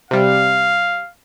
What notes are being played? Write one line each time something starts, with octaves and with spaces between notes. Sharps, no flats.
C3 G3 F5